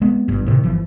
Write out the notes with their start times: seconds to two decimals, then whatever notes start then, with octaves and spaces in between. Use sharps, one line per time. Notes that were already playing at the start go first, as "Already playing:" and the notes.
0.01 G#3 B3 C4
0.28 G1 G2
0.46 A2 C3 D#3
0.63 G1 E3 F3